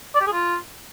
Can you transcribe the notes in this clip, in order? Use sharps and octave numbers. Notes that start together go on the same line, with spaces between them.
D5
G4
G#4
F4